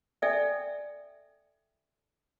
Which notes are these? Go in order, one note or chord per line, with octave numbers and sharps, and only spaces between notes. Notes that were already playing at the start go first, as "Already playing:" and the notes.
A4 D5 E5 G5 G#5